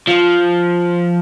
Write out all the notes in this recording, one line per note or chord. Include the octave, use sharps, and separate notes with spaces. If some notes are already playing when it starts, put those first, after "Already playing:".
F3